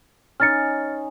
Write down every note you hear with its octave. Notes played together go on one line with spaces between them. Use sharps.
C#4 D#4 F6 A6 C#7